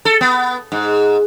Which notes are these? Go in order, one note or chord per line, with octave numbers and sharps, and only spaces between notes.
A4
B3
G#2